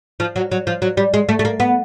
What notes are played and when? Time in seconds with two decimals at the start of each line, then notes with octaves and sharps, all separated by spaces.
0.20 F3
0.36 F#3
0.52 F#3
0.67 F3
0.82 F#3
0.97 G3
1.14 G#3
1.29 A3
1.39 A3
1.45 A#3
1.60 B3